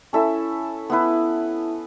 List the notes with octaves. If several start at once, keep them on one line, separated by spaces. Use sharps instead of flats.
C#4 E4 A4 E5
B3 E4 B4